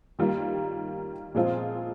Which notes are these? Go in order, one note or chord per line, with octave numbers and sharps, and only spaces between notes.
D#3 G3 A#3 F4
A#2 F3 G#3 C4 F4